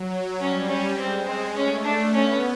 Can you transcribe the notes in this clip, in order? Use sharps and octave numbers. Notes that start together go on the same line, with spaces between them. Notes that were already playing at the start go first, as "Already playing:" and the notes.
Already playing: F#3
F#3
G3 C#4
C#4
G#3 C4
C4
A3 C#4
D4
B3 C#4